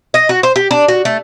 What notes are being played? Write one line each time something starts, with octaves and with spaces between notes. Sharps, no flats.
D#5
F#4
C5
G4
D4
F#4
A3